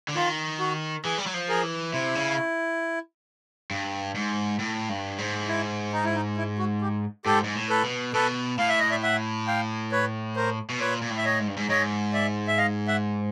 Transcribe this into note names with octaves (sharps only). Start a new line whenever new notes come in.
D3
D#3 F4
F#4
E3 G#4
G3
F#3
F3
G#4 A#4
E3
C3 E4
C#3
G2
G#2
A2
G2
G#2
E4
D#4
E4
D#4
E4
F#4
G4
G#2 G4 A4
G#2
A2
A4 B4
B2
B2 A4 B4
A2 F5
E5
D#5
D5 E5
E5 F#5
F5 G5
B4 C#5
A#4 C5
B2
A#2 B4 C#5
A#2
A2
E5
C#5 D#5
G#2
G2
G#2
G#2 C#5 D#5
D5 E5
E5
D#5 F5
E5 F#5